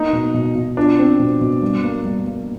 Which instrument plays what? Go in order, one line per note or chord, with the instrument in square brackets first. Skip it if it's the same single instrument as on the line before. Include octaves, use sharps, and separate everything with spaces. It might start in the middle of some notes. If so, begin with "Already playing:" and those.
Already playing: [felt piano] A#3 [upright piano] D#4
[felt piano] B2
B2
B2
[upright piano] D4 [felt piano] F4
[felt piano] C4
B2
B2
G2
A#3
G2
A#3